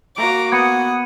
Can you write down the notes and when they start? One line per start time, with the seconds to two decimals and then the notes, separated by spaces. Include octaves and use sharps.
0.17 A#3 F#4 A#5 D6
0.52 B3 F#5 G#6 C#7 D#7